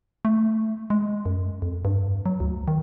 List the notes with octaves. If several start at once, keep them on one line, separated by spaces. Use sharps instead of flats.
A3
G#3
F#2
F2
G2
F#3
D2
D#3